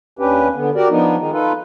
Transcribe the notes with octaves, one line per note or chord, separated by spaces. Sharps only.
D#2 C#4 D4 G4 B4
D3 B3
F#4 G4 A#4 D5
F3 B3 D4 D#4
D#3 G#3 D#4
D#4 F4 A4 B4